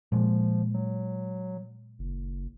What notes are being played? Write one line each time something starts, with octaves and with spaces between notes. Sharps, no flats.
A#2 F3 G#3
F#3
F#1